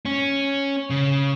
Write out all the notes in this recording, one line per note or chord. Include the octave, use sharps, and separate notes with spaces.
C#4
C#3